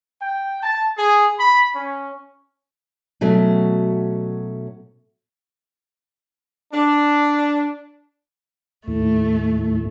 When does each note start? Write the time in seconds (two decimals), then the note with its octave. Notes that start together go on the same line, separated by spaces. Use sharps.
0.21 G5
0.62 A5
0.97 G#4
1.39 B5
1.74 C#4
3.21 B2 F#3 A3 C#4
6.74 D4
8.88 D#2 A2 A3